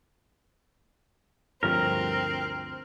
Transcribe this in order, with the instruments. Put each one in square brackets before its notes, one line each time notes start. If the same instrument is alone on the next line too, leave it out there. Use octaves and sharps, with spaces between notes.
[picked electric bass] D2 G2 F3 [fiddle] C4 [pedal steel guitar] A#4